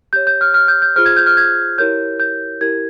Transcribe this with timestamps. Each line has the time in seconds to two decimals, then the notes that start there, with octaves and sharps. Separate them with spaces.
0.13 G4 C#5 G6
0.27 G6
0.41 F6
0.54 F6
0.68 G6
0.82 G6
0.96 F4 G#4 C5 F6
1.06 G#6
1.17 G6
1.26 F6
1.37 G#6
1.78 E4 G4 A#4 C#5 G6
2.20 G6
2.61 E4 G4 A#4 G#6